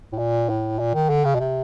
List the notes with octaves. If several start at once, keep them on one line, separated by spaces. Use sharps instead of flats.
A2
A#2
A2
A#2
D#3
D3
C#3
B2
C3